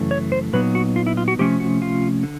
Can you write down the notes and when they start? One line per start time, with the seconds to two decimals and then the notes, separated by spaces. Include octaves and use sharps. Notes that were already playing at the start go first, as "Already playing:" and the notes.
Already playing: F#2 C#3 E3 A3
0.11 C#5
0.32 C5
0.53 A#2 F#3 B3 D#4 B4
0.75 F#4
0.96 F4
1.07 E4
1.17 F4
1.28 F#4
1.39 C3 F3 A3 C#4 G4
1.60 F#4
1.82 F4
2.23 D3